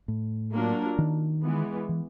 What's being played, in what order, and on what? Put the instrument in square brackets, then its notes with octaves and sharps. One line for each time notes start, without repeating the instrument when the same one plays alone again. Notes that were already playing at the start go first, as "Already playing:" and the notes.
[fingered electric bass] A2
[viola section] F#3 A#3 D4 F4 A#4
[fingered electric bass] D#3
[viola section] E3 G#3 B3
[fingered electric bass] E3